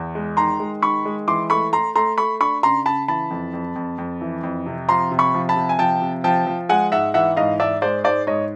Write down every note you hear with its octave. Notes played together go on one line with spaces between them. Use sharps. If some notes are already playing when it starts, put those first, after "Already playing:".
Already playing: E2
G#3
D#3 A#5 C6
G#3
D#3 B5 C#6
G#3
E3 C6 D6
A3 B5 C#6
A3 A#5 C6
A3 A#5 C6
A3 B5 C#6
D4 B5 C#6
C#3 A#5 C6
C#3 A5 B5
E3 A5 B5
F2
F2
F2
F2
E3
F2
C3
F3 A#5 C6
C3
B5 C#6
F3
A5 B5
C3
G#5
F3 G5 A5
C3
F3 G5 A5
F3
G#3 F#5 G#5
G#2 E5 F#5
E3 E5 F#5
G#2 D#5 F5
G#2 D5 E5
G#3 C5 D5
G#2 C5 D5
G#2 C#5 D#5